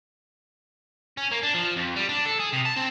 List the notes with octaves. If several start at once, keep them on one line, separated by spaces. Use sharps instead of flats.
C#4
A#3
D4
F3
F2
G3
D4
A4
G#4
C3
A5
C4